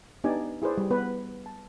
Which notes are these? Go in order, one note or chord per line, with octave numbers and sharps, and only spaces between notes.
B3 D4 D#4 G4 D5 G#5
E4 G#4 B4 C5 D5
G3
B3 B4
A5